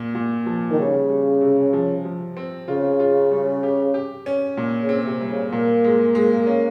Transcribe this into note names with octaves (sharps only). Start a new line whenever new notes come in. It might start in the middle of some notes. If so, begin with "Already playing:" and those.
Already playing: A#2
A#2
F3
D#3
C#3 G3
G3
C3
F3
F3
C4
C#3 F4
F4
G3
G4
G4
C#4
A#2
C#3
C4
C3
G3
C#3
A#2 A#3
G#3
G#3
C#4